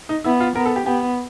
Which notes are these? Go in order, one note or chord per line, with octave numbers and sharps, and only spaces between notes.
D#4
B3 E4
F4
B3 A#4
A4
G4
B3 G4